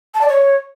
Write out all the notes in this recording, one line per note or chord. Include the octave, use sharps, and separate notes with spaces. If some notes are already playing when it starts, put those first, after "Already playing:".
A5
D5
C#5